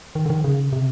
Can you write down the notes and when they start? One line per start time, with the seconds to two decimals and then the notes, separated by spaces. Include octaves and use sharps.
0.15 D#3
0.25 D3
0.30 D#3
0.44 C#3
0.73 C3